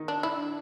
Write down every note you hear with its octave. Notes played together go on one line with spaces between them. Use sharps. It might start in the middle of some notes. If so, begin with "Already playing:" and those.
Already playing: D#3 D#4
D4
D4 E4